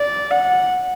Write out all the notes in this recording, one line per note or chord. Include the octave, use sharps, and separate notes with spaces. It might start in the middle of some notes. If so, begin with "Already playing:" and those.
Already playing: D5
F#5